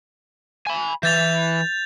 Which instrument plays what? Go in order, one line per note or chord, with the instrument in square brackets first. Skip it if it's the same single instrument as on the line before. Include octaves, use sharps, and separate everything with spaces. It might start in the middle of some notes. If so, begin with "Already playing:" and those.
[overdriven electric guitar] G#5 B5
[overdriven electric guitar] E3 [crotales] G6 A6 F7